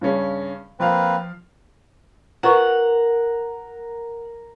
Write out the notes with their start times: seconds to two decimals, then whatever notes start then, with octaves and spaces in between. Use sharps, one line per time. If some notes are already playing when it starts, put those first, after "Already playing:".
0.01 G2 C#3 C#4
0.80 F3 A#3 C4 B4 F5
2.43 F4 A#4 B4 F#5 A#5 C#6